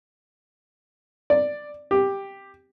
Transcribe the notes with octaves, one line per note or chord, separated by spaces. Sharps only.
D5
G4